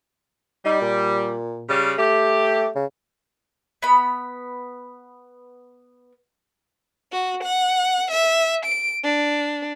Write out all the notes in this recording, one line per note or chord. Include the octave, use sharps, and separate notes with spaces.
G3 D#4
A#2
C#3 G3
A3 G4
C#3
B3 B5
F#4
F#5
E5
D7
D4